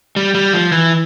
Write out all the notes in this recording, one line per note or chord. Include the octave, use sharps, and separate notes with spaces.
G3
G3
F3
E3